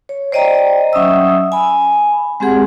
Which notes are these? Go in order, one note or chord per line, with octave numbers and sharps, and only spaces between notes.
C#5
C5 D5 D#5 G5 A#5
F#3 C#4 E5 D#6 E6
G#5 B5
G#3 C4 G4 G#4 F#5